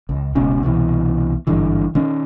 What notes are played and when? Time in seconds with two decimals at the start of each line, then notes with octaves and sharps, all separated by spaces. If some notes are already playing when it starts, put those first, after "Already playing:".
0.09 C#2
0.35 F1 C#2 B2 C#4
0.63 C2 B2 E3
1.47 G#1 G2 D3 E3
1.95 D#3 C#4